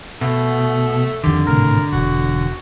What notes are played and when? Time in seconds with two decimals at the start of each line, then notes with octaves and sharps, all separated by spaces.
0.21 B2 A3
1.24 F2 D3 D#3 G4
1.47 G#1 A2 C3 A#4
1.92 E1 F#4